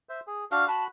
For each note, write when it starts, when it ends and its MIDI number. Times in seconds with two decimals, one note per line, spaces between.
0.09 0.20 72
0.09 0.20 76
0.27 0.45 68
0.51 0.67 62
0.51 0.67 66
0.51 0.67 77
0.51 0.67 89
0.68 0.87 66
0.68 0.84 81
0.68 0.87 83
0.68 0.87 90